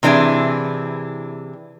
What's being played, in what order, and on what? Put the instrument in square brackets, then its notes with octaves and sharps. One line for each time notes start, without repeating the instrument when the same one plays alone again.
[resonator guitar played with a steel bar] C3 E3 D4 E4 G#4